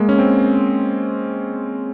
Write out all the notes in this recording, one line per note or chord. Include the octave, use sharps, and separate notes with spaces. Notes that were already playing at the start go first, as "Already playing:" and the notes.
Already playing: G#3 A#3
C#4
C4